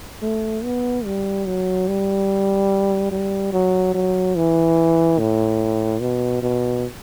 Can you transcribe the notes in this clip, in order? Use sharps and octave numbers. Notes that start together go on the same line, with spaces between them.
A3
B3
G3
F#3
G3
G3
F#3
F#3
E3
A2
B2
B2